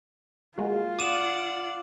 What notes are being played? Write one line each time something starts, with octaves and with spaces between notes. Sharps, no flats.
G#3 A#3 F4 F#4
D5 F#5 D6 D#6 E7